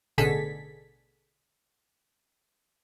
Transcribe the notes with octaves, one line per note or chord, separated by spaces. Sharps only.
A1 B2 D3 G#4 A4 B6